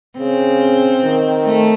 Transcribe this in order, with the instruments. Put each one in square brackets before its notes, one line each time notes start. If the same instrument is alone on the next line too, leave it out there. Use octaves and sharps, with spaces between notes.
[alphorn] C#3 [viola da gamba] C4
[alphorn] D#3
[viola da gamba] A3